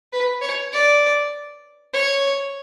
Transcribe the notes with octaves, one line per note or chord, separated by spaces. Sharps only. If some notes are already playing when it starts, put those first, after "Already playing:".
B4
C#5
D5
C#5